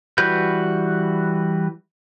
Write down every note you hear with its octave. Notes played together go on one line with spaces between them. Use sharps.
E3 G3 F#4 B4 G6